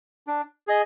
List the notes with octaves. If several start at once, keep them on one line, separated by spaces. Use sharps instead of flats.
D4
G#4 D#5